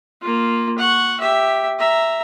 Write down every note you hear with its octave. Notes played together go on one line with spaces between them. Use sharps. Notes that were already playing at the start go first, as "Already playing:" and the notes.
A#3 F4
F#5 C#6
G4 E5
E5 A#5